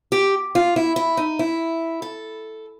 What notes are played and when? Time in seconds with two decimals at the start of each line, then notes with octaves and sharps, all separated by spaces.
0.12 G4
0.55 F4
0.76 E4
0.96 E4
1.17 D#4
1.39 E4
2.02 A4